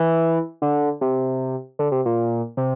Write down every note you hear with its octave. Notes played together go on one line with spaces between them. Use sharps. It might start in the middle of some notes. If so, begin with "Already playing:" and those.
Already playing: E3
D3
C3
D3
C3
A#2
C3